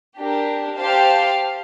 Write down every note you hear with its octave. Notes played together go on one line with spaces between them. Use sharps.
D4 G4 A#4
G4 C5 F5 A5